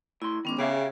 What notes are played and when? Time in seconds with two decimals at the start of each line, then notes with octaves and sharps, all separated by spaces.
0.22 A2 E4 C6
0.45 D#3 G#3 B3 C#4 D6
0.59 C#3 G4 G#4 E5 F5